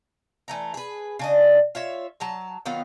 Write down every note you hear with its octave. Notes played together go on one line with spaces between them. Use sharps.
E3 A3 A#5
G#4 B4
C#3 D4 D#5
F4 C#5 E5
F#3 A5 A#5
D#3 F#3 B3 F4